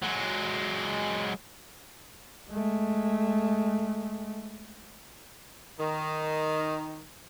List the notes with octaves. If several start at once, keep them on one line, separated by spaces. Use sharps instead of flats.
F#3 G#3
G#3 A3
D#3